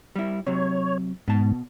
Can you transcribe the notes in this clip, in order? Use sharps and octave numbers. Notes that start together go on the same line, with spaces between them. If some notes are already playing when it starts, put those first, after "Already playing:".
G3 E4
C3 F#3 C#5
G#2 B2 A5